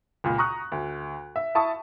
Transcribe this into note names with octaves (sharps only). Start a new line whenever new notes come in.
C#2 A#2
A#5 C#6 D#6 F#6
D2
E5
E4 E5 A5 C#6 D#6